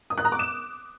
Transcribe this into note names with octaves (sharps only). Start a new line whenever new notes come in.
D#6
F#6
A#5
D6
E7